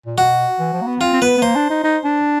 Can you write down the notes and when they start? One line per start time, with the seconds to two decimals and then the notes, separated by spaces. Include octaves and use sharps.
0.06 A#2
0.17 B2 F#4
0.59 E3
0.73 F3
0.82 A#3
0.88 B3
1.00 C4 F4
1.13 C4
1.22 B3 B4
1.38 B3
1.42 A#3 C5
1.55 D4
1.70 D#4
1.84 D#4
2.05 D4